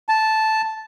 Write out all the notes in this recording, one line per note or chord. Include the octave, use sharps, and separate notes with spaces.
A5